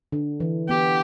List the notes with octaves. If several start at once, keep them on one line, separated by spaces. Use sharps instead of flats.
D3
E3
B3 G4